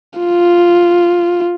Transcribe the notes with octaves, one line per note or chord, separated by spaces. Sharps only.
F4